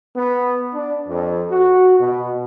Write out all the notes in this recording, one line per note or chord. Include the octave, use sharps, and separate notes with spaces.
B3
D4
F2
F#4
B2